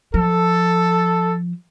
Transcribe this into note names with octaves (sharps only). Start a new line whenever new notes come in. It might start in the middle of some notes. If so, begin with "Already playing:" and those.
F3 A4